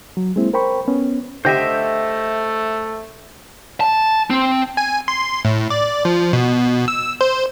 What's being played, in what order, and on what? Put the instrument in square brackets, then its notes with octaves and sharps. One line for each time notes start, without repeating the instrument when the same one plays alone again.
[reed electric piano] F#3
G#3 A#3 C4 E4
A#4 C5 G5 B5 C#6
B3 C#4
[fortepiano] D3 G4 [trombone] A3 [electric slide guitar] C5 D#5 E5
[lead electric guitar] A5
C4
[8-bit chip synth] G#5
C6
A2
D5
F3
B2
E6
C5